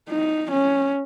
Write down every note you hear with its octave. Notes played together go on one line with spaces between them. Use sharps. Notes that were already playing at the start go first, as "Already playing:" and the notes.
D#4
C#4